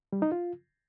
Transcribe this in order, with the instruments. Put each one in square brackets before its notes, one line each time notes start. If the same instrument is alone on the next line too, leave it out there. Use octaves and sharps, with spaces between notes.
[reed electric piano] G3
D#4
F4